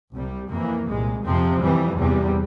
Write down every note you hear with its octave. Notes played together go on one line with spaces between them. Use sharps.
C2 C3 G3
F2 E3 A#3
C2 A#2 G#3
F2 C3 F3 C4
F2 E3 G3
E2 C3 G3